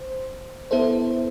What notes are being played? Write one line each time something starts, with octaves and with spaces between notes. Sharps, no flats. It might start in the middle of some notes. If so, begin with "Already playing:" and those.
Already playing: C5
B3 E4 A4 C5